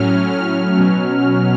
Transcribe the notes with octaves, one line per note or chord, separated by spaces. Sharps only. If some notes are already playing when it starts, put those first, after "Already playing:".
Already playing: A2 F#3 C#4 F6
F6
B2 F#3 C#4